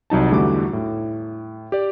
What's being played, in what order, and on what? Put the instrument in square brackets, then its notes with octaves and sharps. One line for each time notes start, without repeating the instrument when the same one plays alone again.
[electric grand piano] C2 F#3 D#4 A5
E2 D3 G3 A3 F#4 D6
A2
G4 D5